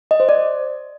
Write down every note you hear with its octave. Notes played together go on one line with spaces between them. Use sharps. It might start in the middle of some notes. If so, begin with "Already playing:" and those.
D#5
C5
D5